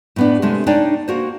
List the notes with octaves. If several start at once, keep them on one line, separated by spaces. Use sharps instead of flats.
A2 B3 D4
C3 G#3 A3
D4 D#4 C#5 D5 G5
A#3 F#4 C5